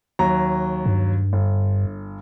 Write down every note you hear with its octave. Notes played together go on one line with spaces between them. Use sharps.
D#2 F#3 A#5
G2
G1